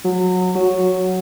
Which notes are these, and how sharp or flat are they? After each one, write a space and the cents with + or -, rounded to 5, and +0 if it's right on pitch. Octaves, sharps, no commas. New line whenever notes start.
F#3 -20
F#3 +0